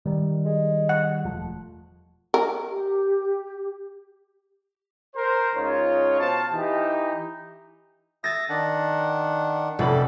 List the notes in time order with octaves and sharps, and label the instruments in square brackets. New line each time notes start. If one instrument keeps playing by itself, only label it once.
[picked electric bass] D#3 [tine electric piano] G3
[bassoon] G#3
[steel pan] F#5
[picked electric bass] E1 F3 A3
[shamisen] A#4
[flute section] G4
[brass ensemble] A#4 C5
C#2 D#4 F4 C#5
B2 C5 F5 A5
E3 D#4 G4
[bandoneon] E5 D#6 [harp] A6 A#6
[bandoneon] D#3 D4 F#5
[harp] F1 D5 B5 [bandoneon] C#4 A4